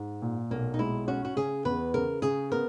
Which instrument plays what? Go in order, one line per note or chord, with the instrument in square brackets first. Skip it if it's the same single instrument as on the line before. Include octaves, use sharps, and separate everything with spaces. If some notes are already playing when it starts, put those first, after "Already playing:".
Already playing: [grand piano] G#2
A#2
[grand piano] B1 [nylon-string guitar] A#3
[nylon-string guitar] D#4
[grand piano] G#3 [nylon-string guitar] E4
[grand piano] C#4 [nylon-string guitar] F#4
[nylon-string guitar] F#4
[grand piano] C#3 [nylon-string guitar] G#4
[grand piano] E2 [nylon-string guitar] B4
[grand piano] C#3 [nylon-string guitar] A#4
[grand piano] C#3 [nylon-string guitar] G#4
[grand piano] B3 [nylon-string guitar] A#4